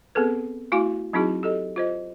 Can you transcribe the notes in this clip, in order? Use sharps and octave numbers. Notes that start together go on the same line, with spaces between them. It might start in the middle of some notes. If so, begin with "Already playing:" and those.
B3 C4 G#4 A4 B4
A3 E4 F#4 F5 G#5 D6
F#3 C4 D#4 E4 F#4 G#4
G4 A4 D#5
F4 C5 D#5